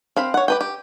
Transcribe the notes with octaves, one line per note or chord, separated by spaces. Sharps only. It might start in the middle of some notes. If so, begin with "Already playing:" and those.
C4 F5 B5
C#5 F#5
G4 B4 G5
G4